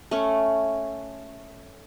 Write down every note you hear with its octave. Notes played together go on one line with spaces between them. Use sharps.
A3 C#4